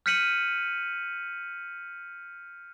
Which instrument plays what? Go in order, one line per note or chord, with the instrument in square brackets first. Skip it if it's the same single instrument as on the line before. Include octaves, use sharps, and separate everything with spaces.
[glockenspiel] F6 G6 B6 C#7 D#7 F#7